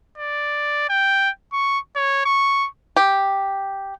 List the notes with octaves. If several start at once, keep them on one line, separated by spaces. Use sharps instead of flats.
D5
G5
C#6
C#5
C#6
G4